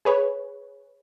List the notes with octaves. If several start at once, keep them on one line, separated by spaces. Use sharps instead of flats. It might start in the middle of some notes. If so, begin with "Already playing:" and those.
G#4 B4 C#5